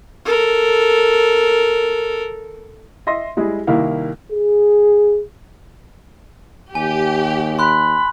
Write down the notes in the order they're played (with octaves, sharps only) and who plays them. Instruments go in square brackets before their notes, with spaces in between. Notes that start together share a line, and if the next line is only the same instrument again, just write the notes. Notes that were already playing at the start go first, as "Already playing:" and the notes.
[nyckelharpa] A4 A#4
[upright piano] D#5 E5 C6 A#6
G3 G#3 E4 G#4
C2 D#3 A#3 E4 F5
[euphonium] G#4
[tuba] D#2 [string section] G4 [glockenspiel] G#5
[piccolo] B5 [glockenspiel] C6 F#6